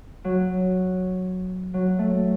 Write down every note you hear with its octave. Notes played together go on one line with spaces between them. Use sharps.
F#3
F#3
A3